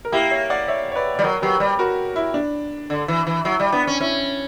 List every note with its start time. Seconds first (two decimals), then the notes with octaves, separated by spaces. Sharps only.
0.05 A#4
0.12 A#3 E4 G4
0.31 C#5 E5
0.50 D5 F#5
0.68 C#5 E5
0.92 C#5
0.96 B4 D5
1.15 G3 D5
1.23 F#3 A#4 C#5
1.42 F#3 G4 B4
1.60 G3
1.79 F#4 A#4
2.16 E4
2.34 D4
2.90 D3
3.08 E3
3.27 E3
3.45 F#3 E4
3.60 G3
3.72 B3 D4
3.87 C#4
4.01 C#4 E4